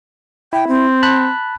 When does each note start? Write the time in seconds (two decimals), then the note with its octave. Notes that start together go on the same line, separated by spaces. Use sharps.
0.53 E4 G5
0.68 C4
1.02 A5 B5 F#6